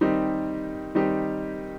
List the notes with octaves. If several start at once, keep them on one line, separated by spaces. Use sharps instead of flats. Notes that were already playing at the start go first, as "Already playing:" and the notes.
D#3 G3 C4 D#4 G4
D#3 G3 C4 D#4 G4